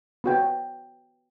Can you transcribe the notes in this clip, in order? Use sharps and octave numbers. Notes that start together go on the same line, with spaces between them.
B3 F#4 G5